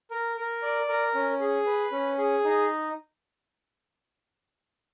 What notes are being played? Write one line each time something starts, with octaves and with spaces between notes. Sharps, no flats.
A#4
A#4
D5
A#4
C#4
G#4
B4
C#4
G#4
D#4